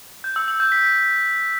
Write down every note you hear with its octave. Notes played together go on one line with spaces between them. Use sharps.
G6
E6
E6
G6
B6